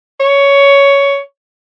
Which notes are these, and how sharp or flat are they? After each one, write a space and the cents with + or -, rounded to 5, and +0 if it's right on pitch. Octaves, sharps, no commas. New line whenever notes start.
C#5 +10